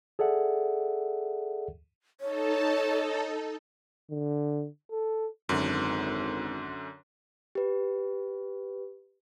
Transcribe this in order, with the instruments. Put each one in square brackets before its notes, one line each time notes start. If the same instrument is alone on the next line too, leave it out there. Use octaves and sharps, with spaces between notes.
[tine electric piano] G#4 A4 D5 E5 F#5
[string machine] D#4 A4 A5 [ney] C#5
[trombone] D3
A4
[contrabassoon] G#1 [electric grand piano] F#2 D3
[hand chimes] G4 B4